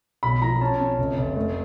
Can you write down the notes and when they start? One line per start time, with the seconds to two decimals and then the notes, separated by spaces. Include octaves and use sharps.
0.23 B1 B5
0.42 F3 A#5
0.61 C#4 A5
0.80 C#4
0.98 F1
1.18 F1
1.36 A3